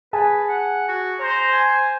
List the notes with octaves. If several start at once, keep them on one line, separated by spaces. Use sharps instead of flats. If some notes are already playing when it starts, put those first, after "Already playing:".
G#4 B4 G#5 A5
F#5
F#4
C5 A#5
G#5